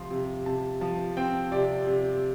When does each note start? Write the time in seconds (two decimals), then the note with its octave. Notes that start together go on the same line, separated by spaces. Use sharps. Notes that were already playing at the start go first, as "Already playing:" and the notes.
Already playing: C3 F3 C6
0.11 C3
0.46 C3 A5
0.81 F3 A5
1.17 C4 G5
1.52 C3 D5
1.87 C3